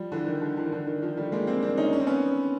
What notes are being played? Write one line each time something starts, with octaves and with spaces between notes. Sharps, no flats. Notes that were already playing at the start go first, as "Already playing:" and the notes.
Already playing: F3 G3
D3 E3
D#3
D3
D3 E3
D#3
D3
D#3
D#3 F3
G3 A3
G#3 A#3
A#3 C4
C4 D4
C#4 D#4
C#4
C4
B3 C#4